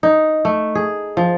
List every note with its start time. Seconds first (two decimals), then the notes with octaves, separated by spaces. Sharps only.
0.03 D#4
0.45 A3
0.75 G#4
1.17 F3